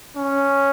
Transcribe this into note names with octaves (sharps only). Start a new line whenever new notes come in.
C#4